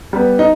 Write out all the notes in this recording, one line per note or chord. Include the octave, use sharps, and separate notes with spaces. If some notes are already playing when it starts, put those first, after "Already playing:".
G3 B3
D#4